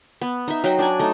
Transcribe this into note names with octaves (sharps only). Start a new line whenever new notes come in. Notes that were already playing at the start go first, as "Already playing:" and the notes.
B3
D#4 E5
F#3 D#4 F#4 G5
D4 D5 G#5
A3 D#4